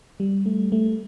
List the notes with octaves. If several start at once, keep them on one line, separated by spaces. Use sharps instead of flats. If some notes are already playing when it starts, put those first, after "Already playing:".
G3
A3
A3